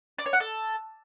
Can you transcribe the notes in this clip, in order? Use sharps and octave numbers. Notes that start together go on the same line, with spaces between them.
D5
C#5
F#5
A4